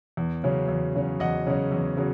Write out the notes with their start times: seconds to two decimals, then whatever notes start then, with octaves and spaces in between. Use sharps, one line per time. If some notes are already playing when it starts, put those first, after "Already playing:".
0.17 E2
0.43 C#3 F#3 C#4
0.69 E2
0.95 C#3 F#3 C#4
1.20 E2 D#5 F#5
1.47 C#3 F#3 C#4
1.72 E2
1.97 C#3 F#3